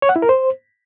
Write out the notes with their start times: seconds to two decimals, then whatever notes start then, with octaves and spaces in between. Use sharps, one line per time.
0.02 C#5
0.09 F#5
0.16 E4
0.22 A#4
0.29 C5